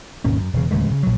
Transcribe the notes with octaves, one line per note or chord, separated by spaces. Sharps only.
G#1 D#2 B2 C#4
F#2
E1 C#3
D1 E2 C#3 G#3
C#3
A#1 F#3